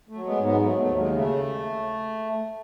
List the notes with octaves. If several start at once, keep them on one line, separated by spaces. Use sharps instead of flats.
A3
F#3
G#3 B3
G#2
G#3 B3
F#3 A3
A3
D#2
G#3
C#3
A3